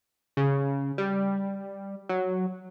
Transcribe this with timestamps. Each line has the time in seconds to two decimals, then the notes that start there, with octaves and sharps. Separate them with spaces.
0.37 C#3
0.98 G3
2.09 F#3